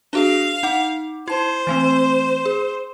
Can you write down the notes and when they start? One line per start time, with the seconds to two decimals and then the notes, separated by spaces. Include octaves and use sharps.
0.13 D4 F#4 G#4 F5
0.63 D#4 F#5 D6
1.28 E4 C5 A5
1.67 E3 A3 C4
2.46 G#4